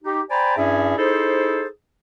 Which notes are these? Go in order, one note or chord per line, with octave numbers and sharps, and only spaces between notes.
D#4 G4
C5 D5 G5 G#5 A#5 B5
G2 C#4 E4 G#4 D5 E5
D#4 E4 G#4 A4 C5